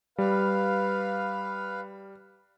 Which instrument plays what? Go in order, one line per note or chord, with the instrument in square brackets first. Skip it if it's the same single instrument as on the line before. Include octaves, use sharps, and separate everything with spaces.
[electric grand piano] G3 [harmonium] B4 F5